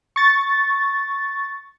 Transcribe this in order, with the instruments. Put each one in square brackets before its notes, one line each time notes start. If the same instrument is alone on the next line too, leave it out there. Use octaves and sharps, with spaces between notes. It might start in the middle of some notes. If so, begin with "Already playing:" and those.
[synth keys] C#6 A6